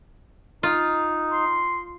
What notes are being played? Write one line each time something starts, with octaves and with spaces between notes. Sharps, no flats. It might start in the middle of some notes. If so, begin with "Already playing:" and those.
D#4 F4
C6